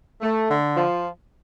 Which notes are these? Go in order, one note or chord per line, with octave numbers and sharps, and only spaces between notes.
A3
D3
F3